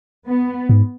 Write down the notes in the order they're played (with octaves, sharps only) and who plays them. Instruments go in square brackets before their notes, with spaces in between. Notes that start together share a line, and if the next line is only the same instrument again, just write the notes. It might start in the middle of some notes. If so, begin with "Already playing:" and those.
[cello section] B3
[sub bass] G#2